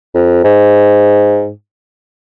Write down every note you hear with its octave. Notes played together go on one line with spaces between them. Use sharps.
F2
G#2